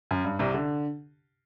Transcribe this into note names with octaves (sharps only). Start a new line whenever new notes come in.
F#2
G2
C2 C3
D3